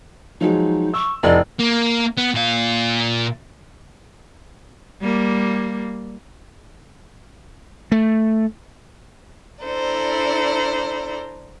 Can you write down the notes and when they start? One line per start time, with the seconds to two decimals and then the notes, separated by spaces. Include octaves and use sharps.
0.41 F3 F#3 G#3 D#4
0.94 C#6 E6
1.23 F1 A2 D5 D#5
1.60 A#3
2.18 B3
2.34 A#2 F5
5.02 G3 A#3
7.92 A3
9.63 D4 E4 A4 C5 D5 A#5